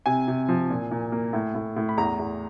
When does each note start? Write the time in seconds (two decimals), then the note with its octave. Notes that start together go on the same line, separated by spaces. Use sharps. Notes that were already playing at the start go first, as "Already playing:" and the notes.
0.06 C3 G#5
0.28 C3
0.49 F3
0.70 A#2
0.91 A#2
1.12 A#3
1.33 A2
1.55 A2
1.77 A2
1.89 B5
1.97 E2 A#5
2.19 E2